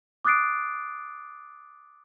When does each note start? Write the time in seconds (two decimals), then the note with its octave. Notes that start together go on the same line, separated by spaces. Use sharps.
0.25 D6 D#6 F#6 A6 C7 D7